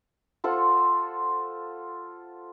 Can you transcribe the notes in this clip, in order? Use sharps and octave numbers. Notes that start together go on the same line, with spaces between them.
F4 A4 C5 F#5